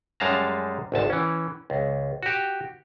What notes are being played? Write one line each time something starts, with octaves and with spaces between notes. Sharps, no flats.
F#2 G3 G#3 F5 A5 A#5
G#1 D2 A5
E3 C#4
C#2
F#4 G4